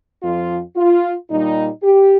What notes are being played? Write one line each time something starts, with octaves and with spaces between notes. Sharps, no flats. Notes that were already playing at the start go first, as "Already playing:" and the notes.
F2 F3 F4
F4
A#2 G3 D#4
G4